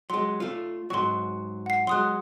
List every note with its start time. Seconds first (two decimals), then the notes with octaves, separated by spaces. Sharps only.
0.10 F#3 G#3 C6
0.40 A3 F4
0.90 G#2 F#3 C6 C#6
1.66 F#5 C7
1.87 F#3 G#3 C6 D#6 F#6